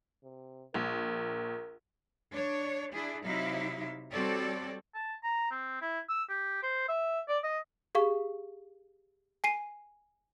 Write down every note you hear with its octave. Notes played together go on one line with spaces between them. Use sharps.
C3
A#1 A#4
D4 C#5
D4 E4 G#4
C3 F#3 D#4 E4 E5 F5
G3 C4 F#4 A4 C#5 D5
A5
A#5
C4
E4
E6
G4
C5
E5
D5
D#5
G4 G#4 F5 C#6
G#5 C7 D#7